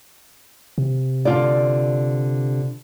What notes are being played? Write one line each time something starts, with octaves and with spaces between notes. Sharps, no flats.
C3
D3 F4 D5